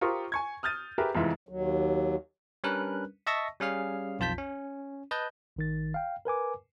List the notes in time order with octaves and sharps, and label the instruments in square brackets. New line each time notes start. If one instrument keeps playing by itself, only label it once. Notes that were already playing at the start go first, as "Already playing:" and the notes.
[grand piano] F4 G4 A#4 C5 C#6 D#6
G#5 C#6 G#6
D#6 F6 G6 A6 D#7
G4 G#4 A#4 B4 E5
F1 E2 G#2 E3 F4 E5
[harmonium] D#2 F#3
[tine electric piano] G3 C#4 D4 A#4 B4 F#6
D#5 E5 A5 C#6 E6 A#6
G3 C#4 G#4 F5 F6
B1 F2 F4 A5 G6 B6
C#4
B4 D#5 A5 G6
G#1 D#3 A6
F5 G5
A#4 B4 G#5 D6